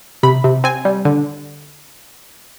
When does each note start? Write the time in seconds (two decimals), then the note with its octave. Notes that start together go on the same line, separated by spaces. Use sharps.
0.23 C3 B5
0.44 C3
0.64 C4 G#5
0.85 G3
1.05 D3